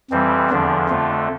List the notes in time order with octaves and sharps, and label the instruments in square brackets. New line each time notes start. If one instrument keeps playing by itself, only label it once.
[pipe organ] F2 E3 G3 C4
E2 D3 F3 D4
F2 D3 A3 F4